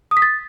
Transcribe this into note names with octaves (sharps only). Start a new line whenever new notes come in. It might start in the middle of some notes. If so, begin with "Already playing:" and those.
D#6
B6
A6